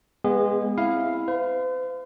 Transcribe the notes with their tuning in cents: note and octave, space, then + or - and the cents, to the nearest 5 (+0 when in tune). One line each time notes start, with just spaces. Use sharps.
G#3 +0 B3 +0 G#4 -35
C4 +5 E4 +0 F5 +0
C5 -45 F5 +0